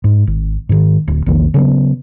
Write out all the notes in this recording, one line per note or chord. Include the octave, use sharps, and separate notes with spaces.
G#2
G#1
G#2 D#3
D1
A#1 E2 D#3 A#3
C#3 F#3 B3